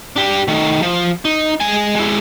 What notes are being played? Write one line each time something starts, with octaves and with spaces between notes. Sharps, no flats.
D4 G4
D#3 A3
F3
D#4
G#3 G#5
G#3 E4